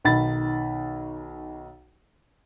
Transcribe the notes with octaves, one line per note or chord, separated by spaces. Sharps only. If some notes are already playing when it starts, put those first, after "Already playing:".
B1 D#3 B5 A6